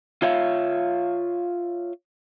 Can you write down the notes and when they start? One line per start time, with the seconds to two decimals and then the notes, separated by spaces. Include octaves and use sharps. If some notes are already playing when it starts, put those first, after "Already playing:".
0.22 F4 C#5 E5 F5